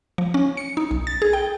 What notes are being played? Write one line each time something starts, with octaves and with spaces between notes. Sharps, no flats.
F3
C#4
C#7
D#4
B1
A6
G#4
G5